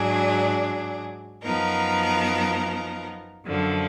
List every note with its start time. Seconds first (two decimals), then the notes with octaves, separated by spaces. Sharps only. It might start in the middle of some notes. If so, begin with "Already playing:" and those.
Already playing: G#2 F#3 D4 G#4
1.42 F#2 F3 B3 D#4 A#4
3.46 F#2 D3 F3